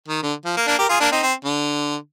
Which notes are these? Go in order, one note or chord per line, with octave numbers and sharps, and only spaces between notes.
D#3
D3
F3
A#3
A#3 D4
G4 A#4
F4 G#4
A#3 D4
C4 D#4
C4
D3